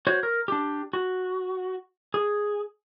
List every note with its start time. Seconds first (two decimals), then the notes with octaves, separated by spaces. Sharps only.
0.07 F#4 C5 C#5
0.23 A#4
0.48 D4 G4
0.93 F#4
2.14 G#4